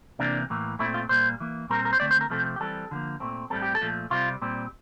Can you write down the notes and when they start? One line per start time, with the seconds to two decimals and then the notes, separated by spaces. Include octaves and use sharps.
0.19 C3 E3 A#3 D4
0.50 A2 E3 A#3
0.79 A#2 A3 C4 E4
0.94 F4
1.09 A#2 G3 A#3 C5
1.40 E3 A#3
1.70 A#2 G3 C4 A#4
1.85 A#4
1.93 C5
2.00 D3 A3 C4 D5
2.11 C5
2.21 A#4
2.30 C3 F3 A3 C4 A4
2.56 G4
2.60 E3 G3 C4 A4
2.91 D3 F3 A#3
3.20 A#2 A3 C4
3.50 A2 G3 C4 A4
3.63 G4
3.75 A4
3.81 A#2 F3 A3
4.10 C3 G3 C4 F4
4.42 A#2 G3 C4